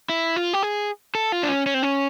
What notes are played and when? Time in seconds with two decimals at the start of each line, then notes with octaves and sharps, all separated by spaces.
0.09 E4
0.36 F4
0.53 G4
0.63 G#4
1.15 A4
1.32 F4
1.43 D4
1.49 C#4
1.66 C#4
1.74 C4
1.83 C#4